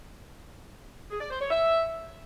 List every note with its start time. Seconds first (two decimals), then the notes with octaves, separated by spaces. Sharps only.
1.11 G#4
1.21 D5
1.31 C5
1.41 C#5
1.51 E5